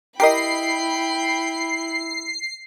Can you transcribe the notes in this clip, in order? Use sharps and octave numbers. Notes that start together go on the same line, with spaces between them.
E4 G4 A#4 D#5 G5 B5 C7